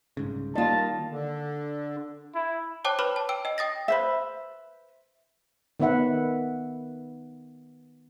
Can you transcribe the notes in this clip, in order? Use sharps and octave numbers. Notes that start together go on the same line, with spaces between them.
C2 G#2 C#3
D#3 G3 A#3 F4 D#5 A5
D3
E4
C5 C#5 G5 A5 D6 F#6
B4 C#5 B5 D6 F6 E7
A5
G5 E6 D7
D#5 G5
G5 D#6 A6 A#6
B4 C5 E5
D#3 B3 B4 E5 F#5